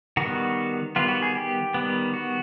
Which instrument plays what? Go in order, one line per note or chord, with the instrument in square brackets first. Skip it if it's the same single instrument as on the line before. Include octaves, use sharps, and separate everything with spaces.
[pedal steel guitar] D#3 G3 B3 F#4
D#3 G3 B3 F4
F#4
G#4
G4
D#3 G3 B3
F#4